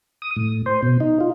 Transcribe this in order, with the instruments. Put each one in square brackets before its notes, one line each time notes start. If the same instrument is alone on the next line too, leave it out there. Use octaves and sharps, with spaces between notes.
[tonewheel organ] D#6
A2
C5
B2
D#4
F4